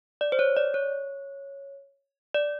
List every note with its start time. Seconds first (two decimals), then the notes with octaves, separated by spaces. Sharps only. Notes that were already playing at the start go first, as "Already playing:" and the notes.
0.21 D5
0.32 C5
0.39 C#5
0.56 D5
0.74 C#5
2.34 D5